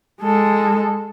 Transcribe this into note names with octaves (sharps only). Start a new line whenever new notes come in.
G#3 A4